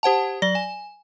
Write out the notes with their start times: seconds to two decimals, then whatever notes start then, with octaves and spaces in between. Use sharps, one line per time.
0.03 G4 C5 F#5 A5
0.42 F#3 D5 A#6 G7
0.55 G#5